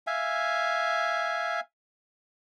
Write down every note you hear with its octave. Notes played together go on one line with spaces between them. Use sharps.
E5 F5 G#5